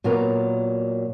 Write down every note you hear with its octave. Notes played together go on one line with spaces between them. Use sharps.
A#2 F#3 B3 A#4